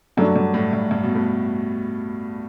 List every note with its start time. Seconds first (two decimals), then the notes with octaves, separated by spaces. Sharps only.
0.17 G2 F#3 A3 D4 F#4
0.36 G2
0.54 A2
0.73 G2
0.91 G2
1.03 B2
1.15 A2